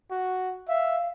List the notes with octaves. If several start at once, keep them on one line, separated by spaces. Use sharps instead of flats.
F#4
E5 F5